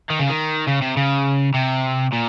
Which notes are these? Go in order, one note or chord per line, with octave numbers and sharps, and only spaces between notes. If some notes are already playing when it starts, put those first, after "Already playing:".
D#3
C#3
D#3
C#3
C3
C#3
C3
A#2